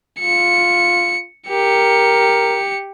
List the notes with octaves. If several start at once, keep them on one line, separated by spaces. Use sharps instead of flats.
F4 C#7
G4 A#4 C#7